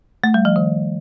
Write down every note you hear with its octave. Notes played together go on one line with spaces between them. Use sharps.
A3
G3
F3
D#3